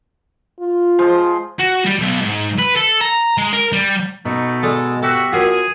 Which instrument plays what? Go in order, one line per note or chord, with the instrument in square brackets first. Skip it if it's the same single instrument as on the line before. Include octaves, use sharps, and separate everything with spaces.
[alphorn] F4
[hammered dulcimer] F3 G#3 C5
[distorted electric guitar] F#4
G3
B1
G#2
B4
A4
A#5
G#3
A#4
G3
[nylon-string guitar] B2 [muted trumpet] A3 [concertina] D#4
[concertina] G#3 A5 [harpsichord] D#4 A4 D5
[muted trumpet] F#4 [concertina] G4 E5 [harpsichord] A4
[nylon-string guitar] F4 A#4 C#5 [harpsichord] F#4 [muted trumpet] G#4